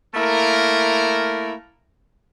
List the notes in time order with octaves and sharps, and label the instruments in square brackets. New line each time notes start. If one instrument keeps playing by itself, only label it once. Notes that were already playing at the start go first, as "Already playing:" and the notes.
[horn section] A3 A#3 E4 A#4